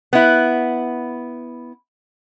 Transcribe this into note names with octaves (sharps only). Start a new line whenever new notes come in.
B3 E4